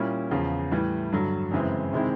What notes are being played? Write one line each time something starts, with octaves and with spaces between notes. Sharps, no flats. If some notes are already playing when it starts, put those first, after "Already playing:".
Already playing: A#2 G3 A#3 C#4 E4
E2 C#3 F3
A2 E3 G3
G2 D3 F#3
F#2 C#3 E3 G#3 C4
C3 D#3 G#3 C4 E4